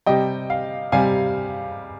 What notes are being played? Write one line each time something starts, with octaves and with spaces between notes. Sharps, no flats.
C3 G3 D#5 G5
F5
C3 G3 F5 G#5